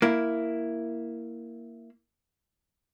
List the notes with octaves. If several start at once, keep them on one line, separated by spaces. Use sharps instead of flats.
A#3 E4